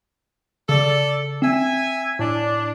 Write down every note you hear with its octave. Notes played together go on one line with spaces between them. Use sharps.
C#3 A4 D5
C4 E5 G#5
A2 D4